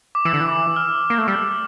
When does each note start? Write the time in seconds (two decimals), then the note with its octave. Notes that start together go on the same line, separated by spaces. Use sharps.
0.15 D6
0.25 E3 E6
0.34 D3
0.41 E3
0.76 F6
1.10 A#3
1.18 A3
1.28 G3 E6